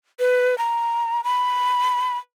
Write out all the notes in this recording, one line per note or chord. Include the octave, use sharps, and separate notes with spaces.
B4
A#5
B5